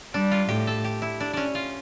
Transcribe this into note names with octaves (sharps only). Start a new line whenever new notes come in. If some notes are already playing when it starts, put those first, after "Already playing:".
G3 D4
F4
A2 G4
A4
G4
E4
D4
C#4 D4
F4